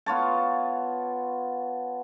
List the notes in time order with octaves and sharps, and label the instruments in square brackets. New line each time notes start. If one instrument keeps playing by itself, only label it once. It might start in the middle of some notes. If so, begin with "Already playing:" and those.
[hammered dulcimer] B3 F4 C#5 A5